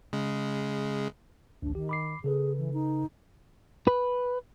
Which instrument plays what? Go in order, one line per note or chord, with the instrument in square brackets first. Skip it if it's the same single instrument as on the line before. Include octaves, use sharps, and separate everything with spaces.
[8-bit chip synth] C#3 G#3
[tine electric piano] A1 D2 [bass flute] D4
[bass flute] D#3 [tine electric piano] G4
[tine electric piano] B5 D6 C7
[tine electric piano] C#3 A4 B4 [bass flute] G#4
[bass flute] E3
D#4
[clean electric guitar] B4